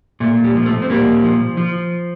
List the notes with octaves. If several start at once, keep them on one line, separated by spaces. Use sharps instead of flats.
A#2 A3
G3
F3
A3
C4
A#2 G3 A#3
F3
F3